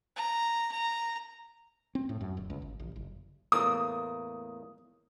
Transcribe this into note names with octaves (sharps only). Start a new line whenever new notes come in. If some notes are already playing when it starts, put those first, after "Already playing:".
A#5
A#5
C4
A2
F#2
D1
C#2
G1
A1
F#1
E2 A2 A#3 D#6